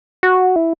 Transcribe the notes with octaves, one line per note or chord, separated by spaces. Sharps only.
F#4
E4